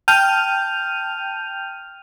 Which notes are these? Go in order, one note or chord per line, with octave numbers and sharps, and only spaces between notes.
G5 A5 F6 G6 D#7 F7